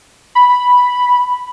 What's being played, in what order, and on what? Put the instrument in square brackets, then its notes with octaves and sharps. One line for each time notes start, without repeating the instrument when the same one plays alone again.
[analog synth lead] B5